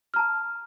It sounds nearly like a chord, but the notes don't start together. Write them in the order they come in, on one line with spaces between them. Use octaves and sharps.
F6 A#5 A5